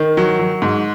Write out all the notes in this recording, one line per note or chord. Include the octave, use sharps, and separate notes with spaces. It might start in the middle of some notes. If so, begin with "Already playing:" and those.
Already playing: D#3
F#3
F#3
G#2